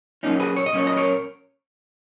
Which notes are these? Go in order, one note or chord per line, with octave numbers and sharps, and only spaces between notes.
A#2 F#3 A#3 C#4 D#4
G#4 B4
C#5
D#5
A#2 F#3 A#3 C#4 C#5
D#5
A#4 C#5